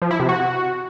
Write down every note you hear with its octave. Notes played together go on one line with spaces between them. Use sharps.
F3
E4
C3
F#4